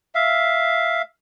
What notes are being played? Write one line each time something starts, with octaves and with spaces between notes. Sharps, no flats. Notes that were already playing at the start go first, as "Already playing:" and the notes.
E5 F5